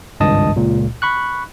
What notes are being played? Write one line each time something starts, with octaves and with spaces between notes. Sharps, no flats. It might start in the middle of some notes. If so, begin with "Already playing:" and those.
G#1 C#2 G2 D#5 A5 D#6
C#2 A#2
B5 C#6 F#6